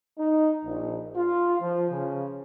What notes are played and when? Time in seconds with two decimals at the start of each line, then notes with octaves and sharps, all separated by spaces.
0.18 D#4
0.64 A#1
1.16 F4
1.60 F3
1.91 C#3